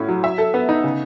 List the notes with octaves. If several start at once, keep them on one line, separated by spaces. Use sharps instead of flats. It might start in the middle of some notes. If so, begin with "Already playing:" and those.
Already playing: A2 C#4 F#4
F#3
E5
A4
B3
D#4
C#3